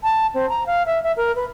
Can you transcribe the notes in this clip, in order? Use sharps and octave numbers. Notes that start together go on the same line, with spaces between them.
A5
C4
A#5
F5
E5
E5
A#4
B4